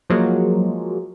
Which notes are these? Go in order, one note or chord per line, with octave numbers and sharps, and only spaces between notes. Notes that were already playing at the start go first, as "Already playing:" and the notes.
F3 F#3 G#3 A#3